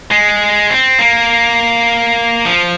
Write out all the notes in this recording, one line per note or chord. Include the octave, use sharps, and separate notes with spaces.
G#3
C4
A#3
F3